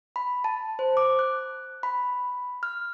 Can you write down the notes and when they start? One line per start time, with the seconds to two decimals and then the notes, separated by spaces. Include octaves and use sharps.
0.16 B5
0.44 A5
0.79 C5
0.97 D6
1.19 F#6
1.83 B5
2.63 F6